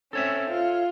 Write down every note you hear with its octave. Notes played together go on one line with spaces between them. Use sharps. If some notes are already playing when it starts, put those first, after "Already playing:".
C4 C#4 A4 C#5 E5
F4